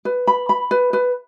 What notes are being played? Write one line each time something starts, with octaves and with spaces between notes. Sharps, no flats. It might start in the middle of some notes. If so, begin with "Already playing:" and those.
B4
B5
B5
B4
B4